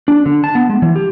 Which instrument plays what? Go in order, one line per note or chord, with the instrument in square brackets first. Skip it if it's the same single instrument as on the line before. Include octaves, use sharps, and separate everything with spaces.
[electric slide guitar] D4
D3
A5
B3
G#3
E3
G4